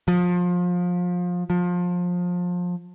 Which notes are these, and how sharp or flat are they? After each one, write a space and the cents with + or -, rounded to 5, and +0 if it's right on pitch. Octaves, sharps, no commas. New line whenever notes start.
F3 +25
F3 +25